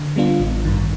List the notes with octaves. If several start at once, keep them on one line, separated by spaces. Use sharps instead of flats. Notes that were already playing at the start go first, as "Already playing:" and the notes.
Already playing: D3
G3 B3 D4 F4
A1
G2 D#3